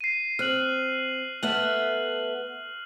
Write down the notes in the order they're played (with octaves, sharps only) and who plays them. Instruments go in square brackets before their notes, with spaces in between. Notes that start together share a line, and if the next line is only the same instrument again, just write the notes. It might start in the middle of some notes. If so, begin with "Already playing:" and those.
[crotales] C7 D#7
[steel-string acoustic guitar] C4 [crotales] F6 F#6 F#7
[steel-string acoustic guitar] A3 B3 E5 [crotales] F6 F#6 F#7